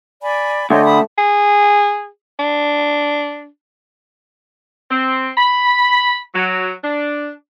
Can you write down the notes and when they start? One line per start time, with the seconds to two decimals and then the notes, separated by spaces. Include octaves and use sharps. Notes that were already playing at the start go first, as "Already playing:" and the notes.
0.22 D5 G#5 B5
0.70 D2 A3 C#5 D#5 G5
0.84 E5 B5 D#6
1.18 G#4
2.39 D4
4.90 C4
5.37 B5
6.35 F#3
6.83 D4